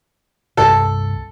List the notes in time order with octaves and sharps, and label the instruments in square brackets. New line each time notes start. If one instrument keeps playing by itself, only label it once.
[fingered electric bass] C2 G2 C3 [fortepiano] A4